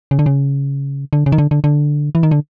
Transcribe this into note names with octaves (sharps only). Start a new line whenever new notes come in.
C#3
D3
C#3
D3
C#3
D#3
D3
D3
D3
E3
D#3
D3